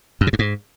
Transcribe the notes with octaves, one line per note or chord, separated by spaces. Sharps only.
F#2
C3
G2
G#2